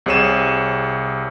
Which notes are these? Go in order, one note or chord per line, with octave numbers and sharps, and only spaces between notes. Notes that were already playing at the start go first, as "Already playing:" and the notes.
C2 C3 G#4 C#5 D#7 E7